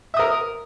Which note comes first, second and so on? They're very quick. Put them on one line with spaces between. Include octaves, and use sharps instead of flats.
E5 D#6 A#4